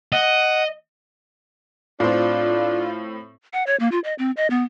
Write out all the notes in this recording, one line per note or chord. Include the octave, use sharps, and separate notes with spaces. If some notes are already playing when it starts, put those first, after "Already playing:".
D#5 F#5
A2 C4 D4 F4
F#5
C#5
A#3
F4
D#5
C4
D#5
B3